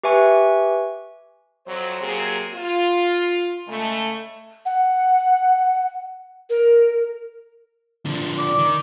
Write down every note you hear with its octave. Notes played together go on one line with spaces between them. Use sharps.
G4 B4 E5 G#5 C#6
F2 F#3 C5
C3 F#3 A#3 G#4
F4
C#3 G#3 A3
F#5
A#4
D3 F3
D5
D#3